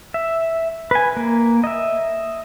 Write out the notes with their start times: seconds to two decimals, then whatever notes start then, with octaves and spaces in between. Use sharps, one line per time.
0.14 E5
0.91 B4 G#5
1.17 A#3
1.64 D#5 E5